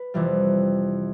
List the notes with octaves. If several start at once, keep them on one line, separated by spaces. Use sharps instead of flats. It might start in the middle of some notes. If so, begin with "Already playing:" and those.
Already playing: B4
F2 C3 E3 G3